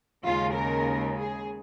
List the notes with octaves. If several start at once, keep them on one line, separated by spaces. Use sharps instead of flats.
D#2 C#3 G#3 F4
A#4
G#4